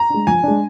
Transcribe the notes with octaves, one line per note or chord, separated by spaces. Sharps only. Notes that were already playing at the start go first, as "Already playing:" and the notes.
Already playing: A#5
G#3 D4
F3 G#5
G#3 D4